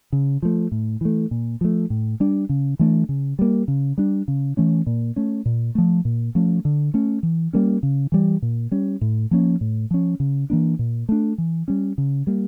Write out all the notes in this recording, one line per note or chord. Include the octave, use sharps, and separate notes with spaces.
C#3
F3 A3
A2
E3 A3
A#2
F3 A3
A2
G3 D4
C#3
E3 A3 D4
C#3
G3 A#3
C#3
G3 D4
C#3
E3 A3 C#4
A#2
A3 C#4
A#2
F3 A3
A#2
F3 A3 C#4
D3
A3 C#4
E3
G3 A#3 C#4
C#3
E3 G3
A#2
G3 C#4
A2
F3 A#3 C#4
A2
F3 C#4
C#3
E3 A#3 D4
A#2
A3 D4
E3
G3 C#4
C#3
G3 A#3